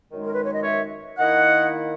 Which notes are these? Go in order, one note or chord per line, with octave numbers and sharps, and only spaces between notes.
F#2 D#3 G#3 D#4
A#4
B4
C#5
D#5
C#5 E5
D#3 A#3 E4 D#5 F#5